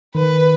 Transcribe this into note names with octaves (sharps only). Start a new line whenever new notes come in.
D#3 B4